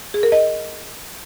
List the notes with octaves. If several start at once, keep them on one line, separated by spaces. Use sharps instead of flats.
G#4
A#4
D#5